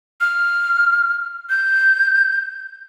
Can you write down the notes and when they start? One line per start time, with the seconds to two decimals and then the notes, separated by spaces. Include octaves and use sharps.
0.21 F6
1.50 G6